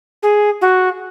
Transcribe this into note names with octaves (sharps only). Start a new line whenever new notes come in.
G#4
F#4